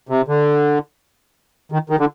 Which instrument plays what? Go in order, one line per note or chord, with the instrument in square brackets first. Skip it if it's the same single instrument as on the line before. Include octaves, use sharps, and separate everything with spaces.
[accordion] C3
D3
D#3
D#3
D3